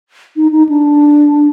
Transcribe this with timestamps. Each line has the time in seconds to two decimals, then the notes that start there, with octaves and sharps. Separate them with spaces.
0.36 D#4
0.52 D#4
0.69 D4